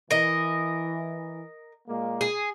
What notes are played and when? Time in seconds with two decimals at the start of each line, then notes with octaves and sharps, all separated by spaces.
0.11 E3 A#4 D#5
1.88 A#2 G#3 A#3
2.21 G#4